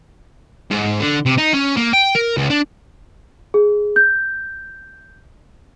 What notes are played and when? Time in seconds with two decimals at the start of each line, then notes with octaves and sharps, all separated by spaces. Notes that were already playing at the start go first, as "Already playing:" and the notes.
0.71 G#2
1.01 D3
1.26 C3
1.38 D#4
1.53 C#4
1.77 A#3
1.93 G5
2.15 A#4
2.37 C#2
2.50 D4
3.54 G#4
3.96 G6